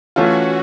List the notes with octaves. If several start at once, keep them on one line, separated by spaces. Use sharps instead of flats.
E3 A3 C#4 F4 F#4